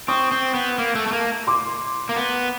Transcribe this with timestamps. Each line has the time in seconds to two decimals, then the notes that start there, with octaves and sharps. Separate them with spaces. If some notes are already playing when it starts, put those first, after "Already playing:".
0.08 C4 C#6 D#6
0.32 C4
0.54 B3
0.78 A#3
0.95 A3
1.08 A3
1.13 A#3
1.47 C6 D6
2.09 A#3
2.16 B3